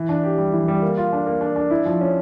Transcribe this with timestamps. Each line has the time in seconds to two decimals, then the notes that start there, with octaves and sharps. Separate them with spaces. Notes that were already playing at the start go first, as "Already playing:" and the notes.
Already playing: E3
0.09 D4
0.24 G4
0.38 G3
0.53 E3
0.68 G3
0.82 A#3
0.97 F4
1.13 D4
1.26 A#3
1.41 D4
1.56 D4
1.71 E4
1.86 F3
2.01 C#4